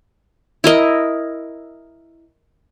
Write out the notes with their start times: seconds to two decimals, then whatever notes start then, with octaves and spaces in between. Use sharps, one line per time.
0.64 E4 A#4 D#5